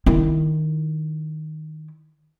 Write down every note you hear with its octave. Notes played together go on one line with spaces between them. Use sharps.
D#3 E4